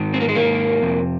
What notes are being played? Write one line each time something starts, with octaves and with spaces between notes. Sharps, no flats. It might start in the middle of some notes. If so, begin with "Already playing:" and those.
Already playing: G#2 D#3
C4
A#3
G#3
G#2 D#3 A#3
F2 C3